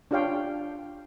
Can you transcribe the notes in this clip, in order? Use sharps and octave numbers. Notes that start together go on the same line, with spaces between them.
D4 F4 G4 C#5 F5 G5